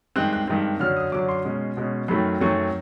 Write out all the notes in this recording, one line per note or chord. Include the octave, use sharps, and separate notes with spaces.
G2 D#3 G#3 C4 F#6
F#6
G2 D#3 G#3 C4
F#2 D3 F#3 F6
D#6
F#2 D3 F#3 D6
C6
B2 G#3 C#4
B2 G#3 C#4
F#2 D#3 F#3 A3 C4 B5
F#2 D#3 F#3 A3 C4 C#6